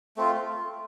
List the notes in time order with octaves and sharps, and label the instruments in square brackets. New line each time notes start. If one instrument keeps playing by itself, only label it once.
[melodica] A3 C4 F4